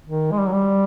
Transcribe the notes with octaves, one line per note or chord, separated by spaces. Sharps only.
D#3
G#3
G3
F#3
G3